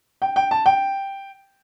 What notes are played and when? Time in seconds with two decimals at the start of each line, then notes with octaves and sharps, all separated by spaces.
0.22 G5
0.36 G5
0.51 A5
0.66 G5